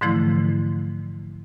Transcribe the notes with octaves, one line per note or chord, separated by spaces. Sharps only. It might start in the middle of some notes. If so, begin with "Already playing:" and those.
G#2 D3 E3 F3 A3 E4